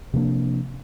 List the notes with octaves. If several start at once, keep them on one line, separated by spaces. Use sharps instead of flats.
C3 F3 A#3 D4